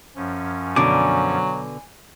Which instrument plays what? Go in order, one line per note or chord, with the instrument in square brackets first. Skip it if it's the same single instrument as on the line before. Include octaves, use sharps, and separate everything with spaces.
[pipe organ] F#2 F3 C#4
[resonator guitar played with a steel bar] B2 D3 [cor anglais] F#3 [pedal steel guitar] G#5 D6